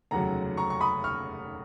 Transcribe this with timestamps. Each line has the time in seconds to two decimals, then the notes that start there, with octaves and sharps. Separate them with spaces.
0.11 F1 D#2 C#3 F#3 F#5 A#5
0.57 A#5 C#6
0.70 C#6
0.81 B5 D#6
1.04 C#6 F6